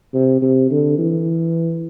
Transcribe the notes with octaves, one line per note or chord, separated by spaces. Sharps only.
C3
C3
D3
E3